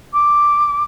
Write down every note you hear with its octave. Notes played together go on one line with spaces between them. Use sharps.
D6